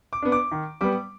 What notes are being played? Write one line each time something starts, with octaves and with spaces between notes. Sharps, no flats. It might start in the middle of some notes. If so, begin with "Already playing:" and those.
D6
B3 D4
D6
D#3
G3 B3 D6